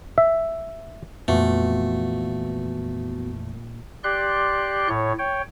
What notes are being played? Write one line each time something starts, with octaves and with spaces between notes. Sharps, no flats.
E5
F2 A#2 E3 A3 B3 F#4
G4 D5 C6 F#6
A2 C#5
C#5 G5